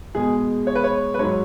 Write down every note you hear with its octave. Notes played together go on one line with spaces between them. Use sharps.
B2 G#3 G#4
C#5
B4
C#5
B4
G#2 F#3 C#5